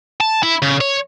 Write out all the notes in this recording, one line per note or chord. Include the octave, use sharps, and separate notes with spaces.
A5
E4
C#3
C#5